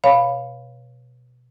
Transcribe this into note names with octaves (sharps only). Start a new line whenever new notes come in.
B2 C#5 F5 B5